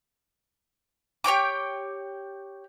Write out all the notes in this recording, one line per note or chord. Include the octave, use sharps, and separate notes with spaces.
G4 C#5 G5 D6